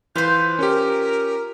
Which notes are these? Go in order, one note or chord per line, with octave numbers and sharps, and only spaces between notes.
E3 F4 B4 C5 G6
C#4 G4 A#4